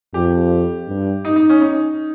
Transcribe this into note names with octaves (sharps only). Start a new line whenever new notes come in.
F2 G4
G2
D#4
D#4
C#4
D#4